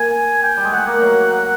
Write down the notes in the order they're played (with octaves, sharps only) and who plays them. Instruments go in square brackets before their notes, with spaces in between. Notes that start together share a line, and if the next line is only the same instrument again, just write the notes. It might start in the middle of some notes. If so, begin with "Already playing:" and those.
Already playing: [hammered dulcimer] A#3 [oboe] G#5
[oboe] G5
[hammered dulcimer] G3
G#3
[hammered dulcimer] A3 [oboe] F#5
[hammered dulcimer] A#3
F#3
[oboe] F#5